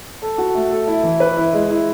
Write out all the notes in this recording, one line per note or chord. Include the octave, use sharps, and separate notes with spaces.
A4
F#4
A3
A4
E4
E3
B4
E4
G#3
E4